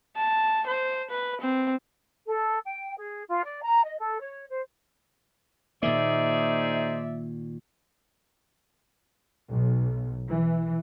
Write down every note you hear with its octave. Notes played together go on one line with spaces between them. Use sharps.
A5
C5
B4
C4
A4
G5
G#4
F4
D5
A#5
D#5
A4
C#5
C5
A#2 D#3 A#3 D#4 G#4 C5 D5 E5
B1
E3